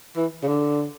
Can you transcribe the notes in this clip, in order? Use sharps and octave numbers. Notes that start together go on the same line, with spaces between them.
E3
C#3
D3